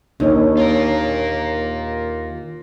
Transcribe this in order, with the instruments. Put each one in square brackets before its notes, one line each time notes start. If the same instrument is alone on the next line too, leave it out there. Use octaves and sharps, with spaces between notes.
[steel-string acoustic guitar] D#2 [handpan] D4 D#4 C#5
[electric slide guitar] F4 A#4